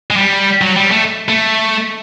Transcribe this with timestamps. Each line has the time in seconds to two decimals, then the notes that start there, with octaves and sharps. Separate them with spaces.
0.10 G#3
0.16 G3
0.61 F#3
0.76 G3
0.91 A3
1.28 A3